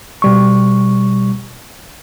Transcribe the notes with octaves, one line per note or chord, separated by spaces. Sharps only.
B2 G3 C#6